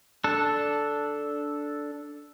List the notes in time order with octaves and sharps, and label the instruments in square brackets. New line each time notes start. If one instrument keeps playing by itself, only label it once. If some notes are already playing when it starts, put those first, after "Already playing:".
[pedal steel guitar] D4 A4